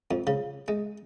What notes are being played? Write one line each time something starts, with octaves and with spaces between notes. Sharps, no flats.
F2
C#3
G#3